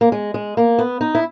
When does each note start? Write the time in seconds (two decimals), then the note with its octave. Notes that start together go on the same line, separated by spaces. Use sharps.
0.01 A#3
0.12 G#3
0.34 G#3
0.57 A#3
0.79 B3
1.01 D#4
1.15 E4